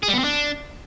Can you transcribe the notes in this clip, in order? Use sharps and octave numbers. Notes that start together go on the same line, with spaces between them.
G#4
G3
B3
C4
D4